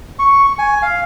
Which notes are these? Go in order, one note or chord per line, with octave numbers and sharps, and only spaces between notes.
C#6
G#5
F5